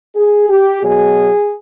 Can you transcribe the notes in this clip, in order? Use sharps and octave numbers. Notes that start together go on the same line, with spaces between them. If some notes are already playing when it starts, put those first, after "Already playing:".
G#4
G4
B2 F#3 G#4